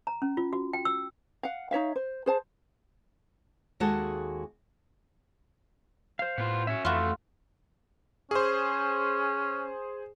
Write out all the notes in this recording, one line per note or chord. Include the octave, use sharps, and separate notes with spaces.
A#5
C#4
F4
F#4
G5
E6
F5 F#5
D#4 C#5 E5 F5
C5
G#4 C5 A5
D#2 G#3 F#4 G#4 A4 A5
C5 F5
A2 B3 F4
C#4 F#4 E5
F2 E3 A3 F4 F#4
C#4 G#4 C5